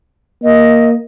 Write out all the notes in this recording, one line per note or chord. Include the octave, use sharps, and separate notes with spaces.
A#3 D#5